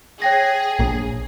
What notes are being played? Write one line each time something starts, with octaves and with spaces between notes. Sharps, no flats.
G#4 C#5 G5 A#6
A#1 A#2